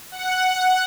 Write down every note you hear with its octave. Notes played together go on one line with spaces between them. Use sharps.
F#5